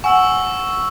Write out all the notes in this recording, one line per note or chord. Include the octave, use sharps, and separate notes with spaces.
F#5 G#5 C#6 E6 F#7